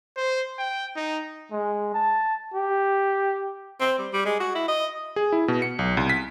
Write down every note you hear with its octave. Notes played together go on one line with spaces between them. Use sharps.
C5
G5
D#4
G#3
A5
G4
C4
G3
G3
G#3
F#4
E4
D#5
G#4
E4
B2
C#7
B1
C2
B6